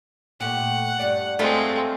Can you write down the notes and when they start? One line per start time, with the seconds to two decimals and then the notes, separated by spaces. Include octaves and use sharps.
0.40 A#2 A3 G4 F#5
0.99 G2 G4 D5
1.39 G#3 A3 C4 F4